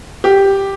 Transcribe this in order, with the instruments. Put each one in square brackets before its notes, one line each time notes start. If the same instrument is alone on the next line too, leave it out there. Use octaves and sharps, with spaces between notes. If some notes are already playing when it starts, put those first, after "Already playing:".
[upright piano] G4